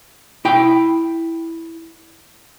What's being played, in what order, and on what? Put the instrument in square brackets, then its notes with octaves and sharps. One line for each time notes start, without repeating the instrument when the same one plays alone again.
[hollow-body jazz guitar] E4 G5